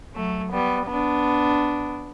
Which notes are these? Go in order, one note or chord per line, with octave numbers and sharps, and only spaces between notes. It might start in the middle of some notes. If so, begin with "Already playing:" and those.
F#3 A3
G3 B3
B3 D4